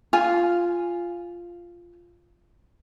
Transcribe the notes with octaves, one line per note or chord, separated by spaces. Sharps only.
F4 G#5